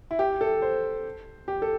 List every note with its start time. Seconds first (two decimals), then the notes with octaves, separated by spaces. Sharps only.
0.11 E4
0.19 G4
0.41 A4
0.62 C5
1.48 G4
1.62 A4